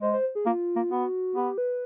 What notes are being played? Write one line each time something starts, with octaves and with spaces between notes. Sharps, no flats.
G#3 C5
C5
G#4
A#3 F4
A#3
B3 F#4
B3 G4
B4